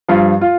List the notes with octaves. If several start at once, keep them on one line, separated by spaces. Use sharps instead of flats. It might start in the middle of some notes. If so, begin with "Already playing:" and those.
G2 F3 F4
F4